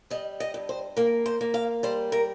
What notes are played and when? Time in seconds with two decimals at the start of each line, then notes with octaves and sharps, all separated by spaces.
0.10 G3 D#5
0.40 D#5
0.54 G2
0.69 C5
0.96 A#3 A#4
1.26 C5
1.41 A#3
1.54 F5
1.83 G3 C5
2.12 A#4